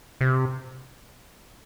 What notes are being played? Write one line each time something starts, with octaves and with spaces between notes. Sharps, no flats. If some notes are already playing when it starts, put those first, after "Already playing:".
C3